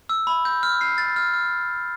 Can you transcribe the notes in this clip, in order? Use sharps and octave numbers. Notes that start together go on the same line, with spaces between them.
E6
B5
G6
F6
C7
A6
F6
F6